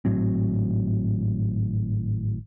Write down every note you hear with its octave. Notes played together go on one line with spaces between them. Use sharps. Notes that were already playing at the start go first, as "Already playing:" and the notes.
G#1 A2 F#3 C4